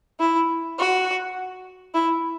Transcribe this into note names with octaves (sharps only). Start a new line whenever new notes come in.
E4
F#4
E4